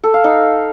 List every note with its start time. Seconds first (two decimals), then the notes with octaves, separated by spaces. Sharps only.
0.04 A4
0.14 F5
0.24 D#4